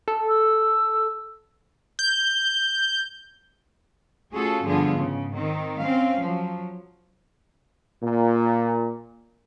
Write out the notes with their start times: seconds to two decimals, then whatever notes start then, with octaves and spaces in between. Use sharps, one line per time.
0.08 A4
0.28 E6
1.99 G6
4.32 A3 C#4 F4 F#4 G#4 A4
4.64 G2 D3 F3 B3 F4 G#4
4.98 G#2 C#3
5.35 D#3 C4
5.79 C4 C#4 F5
6.21 F3 F#3
8.03 A#2